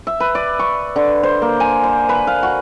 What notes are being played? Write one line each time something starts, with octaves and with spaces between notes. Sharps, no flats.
E5
B4
D5
C#6
D3
C5
A#3
G#5
C5
B4
F5
F#4